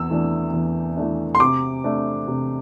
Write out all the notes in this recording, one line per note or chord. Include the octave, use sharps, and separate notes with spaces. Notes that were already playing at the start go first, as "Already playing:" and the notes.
Already playing: E2 E6
E3 A3 D4
E2
E3 A3 D4
C6
C3 D6
A3 D4
C3